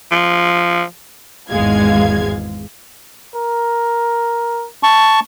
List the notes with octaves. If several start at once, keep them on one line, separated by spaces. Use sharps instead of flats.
F3
G#1 E2 G#2 G#3 F5 G#6
A#4
A5 C#6